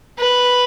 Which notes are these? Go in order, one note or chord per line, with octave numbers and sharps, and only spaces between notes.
B4